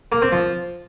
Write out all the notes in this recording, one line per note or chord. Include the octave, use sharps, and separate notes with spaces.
A#3
C4
F3